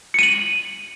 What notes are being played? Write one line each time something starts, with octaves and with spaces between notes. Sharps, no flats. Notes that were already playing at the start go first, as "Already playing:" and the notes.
C#7 D#7 F#7